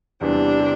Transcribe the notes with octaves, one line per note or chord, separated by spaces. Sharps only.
E2 C3 E3 G3 D4
C3